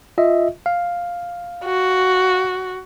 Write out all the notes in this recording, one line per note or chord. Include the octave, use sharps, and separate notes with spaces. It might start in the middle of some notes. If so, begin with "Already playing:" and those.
F4 D#5 E5
F5
F#4